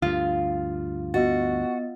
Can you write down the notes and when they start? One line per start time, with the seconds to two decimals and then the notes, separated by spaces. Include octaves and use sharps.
0.02 D2 G2 F4
1.14 B3 F#4 D#5 A6